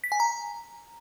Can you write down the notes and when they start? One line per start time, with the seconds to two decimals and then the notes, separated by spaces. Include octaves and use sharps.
0.04 B6
0.12 G#5
0.20 A#5